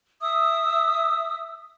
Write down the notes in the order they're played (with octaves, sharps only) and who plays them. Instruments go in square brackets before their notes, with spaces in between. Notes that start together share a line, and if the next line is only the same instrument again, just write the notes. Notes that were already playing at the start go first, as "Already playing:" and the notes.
[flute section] E5 D#6 E6